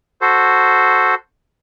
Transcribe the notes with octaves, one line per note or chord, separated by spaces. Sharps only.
F#4 A4 C5